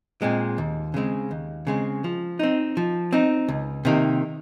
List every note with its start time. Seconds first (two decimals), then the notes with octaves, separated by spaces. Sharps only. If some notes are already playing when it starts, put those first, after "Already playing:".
0.22 A#2 G#3 C4
0.58 D#2
0.94 C#3 G#3 C4
1.31 D#2
1.67 C#3 G#3 C4
2.04 F3
2.39 C4 D#4
2.77 F3
3.13 C4 D#4
3.48 C#2
3.85 C3 D#3 A#3